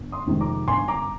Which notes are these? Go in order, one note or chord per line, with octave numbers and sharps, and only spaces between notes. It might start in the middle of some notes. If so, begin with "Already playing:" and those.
Already playing: G1
C6 D#6
F2 C3 D#3 G#3
A#5 D6
G1 G#5 C6
A#5 D6